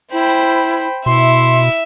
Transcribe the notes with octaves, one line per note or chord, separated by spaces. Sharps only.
E4 C5 G5 B5
B2 E4 E5 C6